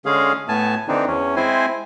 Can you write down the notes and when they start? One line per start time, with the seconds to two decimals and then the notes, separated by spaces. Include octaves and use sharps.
0.06 D3 G#3 C#4 G#4 F5
0.48 A2 A3 B3 G#5 A5
0.88 D3 E3 C4 D4 D#4
1.07 E2 C#4
1.36 G#3 C4 E4 C5 G#5